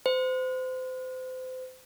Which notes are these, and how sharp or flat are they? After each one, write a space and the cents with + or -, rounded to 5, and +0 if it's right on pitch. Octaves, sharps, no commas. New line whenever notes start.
C5 -30